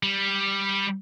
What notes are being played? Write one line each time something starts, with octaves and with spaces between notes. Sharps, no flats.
G3